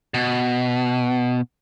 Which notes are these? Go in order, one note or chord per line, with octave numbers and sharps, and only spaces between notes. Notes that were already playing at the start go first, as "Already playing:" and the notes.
B2